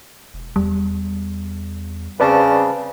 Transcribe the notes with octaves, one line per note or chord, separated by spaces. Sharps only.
E1
E2 G3
C#3 C4 B4 D5 A5